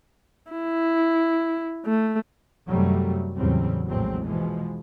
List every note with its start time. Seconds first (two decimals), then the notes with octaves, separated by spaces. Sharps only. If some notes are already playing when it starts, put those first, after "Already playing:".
0.51 E4
1.86 A3
2.67 F#2 C3 D#3 F#3 G3 A3
3.37 E2 A2 C#3 F#3 G3 C4
3.86 A#1 E2 A2 F#3 G#3 C4
4.25 B2 E3 F3 G#3